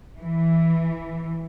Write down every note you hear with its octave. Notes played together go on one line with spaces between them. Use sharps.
E3